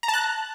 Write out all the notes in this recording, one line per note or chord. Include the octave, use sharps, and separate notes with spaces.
A#5
A5
F#6